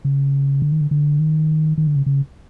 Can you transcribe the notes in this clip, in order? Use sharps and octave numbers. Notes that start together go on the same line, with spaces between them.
C#3
D3
D#3
D3
D3
D#3
D#3
D3
C#3
C#3